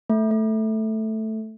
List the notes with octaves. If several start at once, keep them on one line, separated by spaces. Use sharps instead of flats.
A3
A3